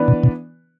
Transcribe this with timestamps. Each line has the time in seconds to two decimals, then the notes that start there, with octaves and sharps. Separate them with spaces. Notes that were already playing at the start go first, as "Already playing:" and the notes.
Already playing: E3 B3 D4 B4 D5
0.08 B2
0.23 B2